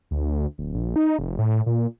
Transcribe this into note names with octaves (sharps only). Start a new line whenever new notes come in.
D2
D1
A#1
D#4
F1
A2
A#2